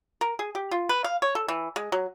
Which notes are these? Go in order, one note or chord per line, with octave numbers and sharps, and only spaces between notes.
A#4
G#4
G4
F4
B4
F5
C#5
A4
E3
G#3
F#3